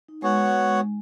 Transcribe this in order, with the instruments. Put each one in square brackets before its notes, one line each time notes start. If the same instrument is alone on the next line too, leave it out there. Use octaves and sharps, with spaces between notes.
[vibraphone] D#4
[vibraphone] G#3 [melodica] B3 F#4 C#5 F#5
[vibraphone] G#3